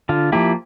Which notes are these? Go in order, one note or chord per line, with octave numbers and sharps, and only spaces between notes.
D3 F4
F3 A#3 E4 G4